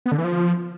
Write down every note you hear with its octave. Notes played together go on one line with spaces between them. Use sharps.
B3
D3
E3
F3